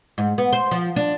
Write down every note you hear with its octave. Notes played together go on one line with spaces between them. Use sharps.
G#2
B3
C5
F3
D4